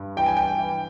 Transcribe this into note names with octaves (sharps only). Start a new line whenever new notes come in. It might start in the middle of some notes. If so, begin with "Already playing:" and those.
Already playing: G2
E3 G5
G#5
G5
E3